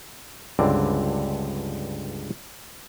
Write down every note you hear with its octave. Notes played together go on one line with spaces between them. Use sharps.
C#2 G2 D3 C4 D5